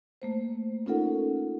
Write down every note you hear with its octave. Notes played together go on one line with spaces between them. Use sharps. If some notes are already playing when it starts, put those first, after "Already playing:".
A3 A#3 C5
C#4 D#4 F4 A4 A#4 F#5